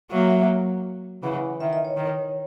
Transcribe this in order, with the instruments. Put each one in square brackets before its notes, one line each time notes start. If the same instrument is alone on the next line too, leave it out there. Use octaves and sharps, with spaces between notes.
[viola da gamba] F#3 A#3 [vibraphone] E5
[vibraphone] F#5
E5
[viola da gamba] C#3 E3 [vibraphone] F#5
[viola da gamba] D#3 [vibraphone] E5
[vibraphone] D#5
C#5
[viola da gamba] D#3